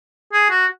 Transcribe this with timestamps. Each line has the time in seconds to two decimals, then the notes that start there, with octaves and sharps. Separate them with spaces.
0.33 G#4
0.50 F#4